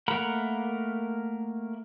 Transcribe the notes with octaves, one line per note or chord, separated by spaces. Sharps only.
A3 A#3 A#4 F#5 B5